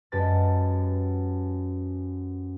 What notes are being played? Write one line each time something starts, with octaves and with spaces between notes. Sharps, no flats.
F#2 G#3 G4 B4 A5 A6